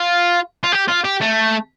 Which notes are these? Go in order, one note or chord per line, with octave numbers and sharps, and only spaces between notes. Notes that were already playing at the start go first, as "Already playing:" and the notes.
Already playing: F4
F4
G4
F4
G4
A3